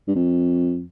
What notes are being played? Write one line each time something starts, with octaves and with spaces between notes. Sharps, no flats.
G2
F2